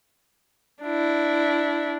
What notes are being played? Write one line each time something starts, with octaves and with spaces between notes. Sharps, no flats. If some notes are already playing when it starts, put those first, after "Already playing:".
D4 E4